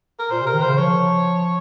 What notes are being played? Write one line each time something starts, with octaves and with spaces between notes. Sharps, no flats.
A#4
A#2 C5
C3 A#4
D#3
C#3 C5
F3 C#5